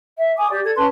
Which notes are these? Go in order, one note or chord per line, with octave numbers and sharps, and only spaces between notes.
E5
G#5 D6 D#6
G4 D5
A4 G#6
C#4 B4 A5 C6